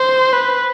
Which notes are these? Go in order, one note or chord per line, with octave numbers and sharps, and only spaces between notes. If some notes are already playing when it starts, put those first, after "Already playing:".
Already playing: C5
B4